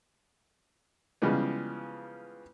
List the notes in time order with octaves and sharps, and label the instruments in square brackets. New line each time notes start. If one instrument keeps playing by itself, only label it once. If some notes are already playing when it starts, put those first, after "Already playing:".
[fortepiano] C#3 E3 F3 G3 G#3 B3